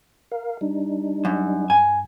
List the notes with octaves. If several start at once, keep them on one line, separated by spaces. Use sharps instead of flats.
A#4 F5
G3 D4 D#4
F#2
G2 G#5